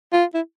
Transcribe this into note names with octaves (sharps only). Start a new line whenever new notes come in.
F4
E4